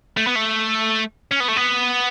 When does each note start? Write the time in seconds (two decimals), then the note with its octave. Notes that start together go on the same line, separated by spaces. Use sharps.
0.17 A3
0.27 B3
0.35 A3
1.31 C#4
1.40 B3
1.48 A3
1.57 B3